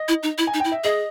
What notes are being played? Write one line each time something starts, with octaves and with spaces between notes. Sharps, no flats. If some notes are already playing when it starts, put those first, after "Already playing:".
Already playing: D#5
E4
D#4
E4
G#5
D#4
E4 G5
E5
G#4 D#5